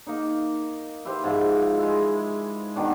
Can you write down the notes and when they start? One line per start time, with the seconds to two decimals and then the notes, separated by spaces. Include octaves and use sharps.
0.07 A#3 D#4
1.05 E4 G4 B4 C5
1.24 G#2 F3 F4 E5
1.79 G#3 E4
2.76 B2 D#3 D4